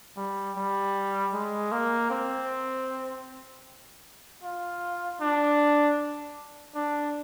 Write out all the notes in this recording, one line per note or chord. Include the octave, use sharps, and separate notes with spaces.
G3
G3
G#3
A#3
C4
F4
D4
D4